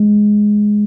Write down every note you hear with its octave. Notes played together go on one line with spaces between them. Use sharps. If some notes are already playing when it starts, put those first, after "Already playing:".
Already playing: G#3